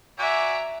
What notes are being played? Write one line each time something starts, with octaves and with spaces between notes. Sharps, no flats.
F#4 D5 E5 G#5 A#5